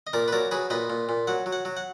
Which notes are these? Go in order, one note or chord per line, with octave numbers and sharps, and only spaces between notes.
D#5
A#2 A#4 D5
B4
F#3 A#4 D5
F#3 G#4 B4
A#2 B4 D#5
A#2
A#2
F#3 F#5
F#3
F#5
F#3
F#5